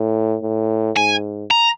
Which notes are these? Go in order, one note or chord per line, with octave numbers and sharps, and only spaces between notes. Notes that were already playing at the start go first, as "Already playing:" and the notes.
Already playing: A2
A2
G#2 G#5
A#5